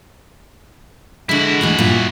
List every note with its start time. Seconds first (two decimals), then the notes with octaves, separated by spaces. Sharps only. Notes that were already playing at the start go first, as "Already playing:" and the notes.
1.29 D3 G#3 E4 F#4
1.61 D2 E3 G#3
1.79 G2 A#2